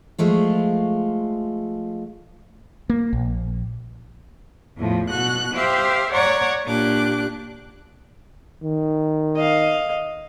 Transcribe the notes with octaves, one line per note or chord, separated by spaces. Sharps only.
F3 G#3 A3 F4
A#3
A#1
E2 A2 F3
B2 F#4 F#6
G4 C5 E5 F5
C#5 D5 F#5 A#5 C#6
A#2 D4 G4 D6 F#6
D#3
D#5 F5